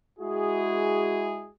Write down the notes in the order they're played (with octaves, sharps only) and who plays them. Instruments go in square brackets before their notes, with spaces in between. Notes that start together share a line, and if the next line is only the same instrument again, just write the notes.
[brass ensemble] G#3 E4 F#4 G#4